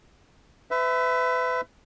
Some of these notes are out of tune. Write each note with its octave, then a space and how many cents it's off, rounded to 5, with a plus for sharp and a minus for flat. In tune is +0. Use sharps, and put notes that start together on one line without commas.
B4 +35 E5 +0